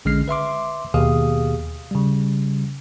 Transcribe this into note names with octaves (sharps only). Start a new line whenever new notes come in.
A#1 D3 G#3 C#4 F6 C7
B4 E5 C6 D6
D#2 B2 G4 G#4 F5 D#6
C#3 G3